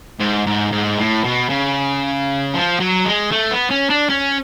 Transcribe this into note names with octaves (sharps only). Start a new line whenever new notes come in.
G#2
G#2
G#2
A2
B2
C#3
F3
F#3
G#3
A3
B3
C#4
D4
C#4